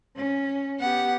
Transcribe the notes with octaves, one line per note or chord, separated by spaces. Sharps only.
C#4
B3 G4 F#5